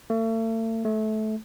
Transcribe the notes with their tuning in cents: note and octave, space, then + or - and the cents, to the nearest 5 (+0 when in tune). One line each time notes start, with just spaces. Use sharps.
A3 +40
A3 -20